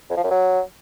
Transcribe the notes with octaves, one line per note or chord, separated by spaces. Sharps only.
F2
F3
F#2
F#3